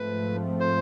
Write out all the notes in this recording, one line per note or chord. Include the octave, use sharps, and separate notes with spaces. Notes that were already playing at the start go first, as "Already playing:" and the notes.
Already playing: G#2 F3 A3 C4 B4
C5